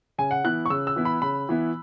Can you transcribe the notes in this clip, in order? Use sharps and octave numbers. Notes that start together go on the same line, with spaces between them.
C#3 G#5
F#5
E3 B3 E4 F#6
C#6
C#3 E6
E6
E3 B3 E4
B5
C#3 B5
E3 B3 E4